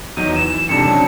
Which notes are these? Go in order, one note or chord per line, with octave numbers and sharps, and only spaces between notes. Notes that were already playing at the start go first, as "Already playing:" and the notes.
E2 F#3 D#4 D#7
E3 E7
F2 G#2 C3 D4 C#7
C#3 F#3 C4